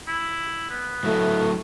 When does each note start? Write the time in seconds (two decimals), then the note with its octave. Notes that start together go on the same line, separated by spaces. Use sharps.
0.08 E4
0.70 B3
1.03 A2 F#3 A3 E4